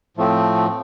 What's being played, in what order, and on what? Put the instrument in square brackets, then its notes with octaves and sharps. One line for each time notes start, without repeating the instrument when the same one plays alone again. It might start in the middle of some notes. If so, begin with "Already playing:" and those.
[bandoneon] A2 F3 A3 C4